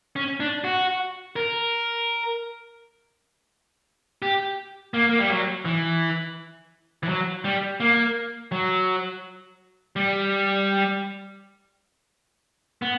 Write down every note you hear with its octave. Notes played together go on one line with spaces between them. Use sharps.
C#4
D4
F#4
A#4
G4
A#3
A#3
G3
F#3
E3
E3
F#3
G3
A#3
F#3
G3
B3